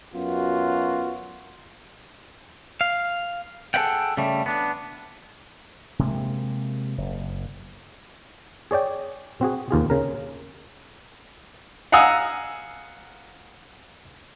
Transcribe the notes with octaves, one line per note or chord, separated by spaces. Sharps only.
F#2 B3 F4 F#4
F5
G#4 A4 B4 E5 F#5 G5
C#3 G3 A3
B3 D4
C3 G#3 A#3
F#1
G#4 C#5 D5 G5
C4 F#4 G#4
D#2 F4 G#4
C#3 A#4
F5 F#5 G#5 A#5 D#6 E6